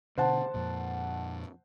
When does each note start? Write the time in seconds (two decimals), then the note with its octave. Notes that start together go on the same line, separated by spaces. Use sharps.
0.18 B2 D3 C5 F#5 A5
0.54 F2 A#2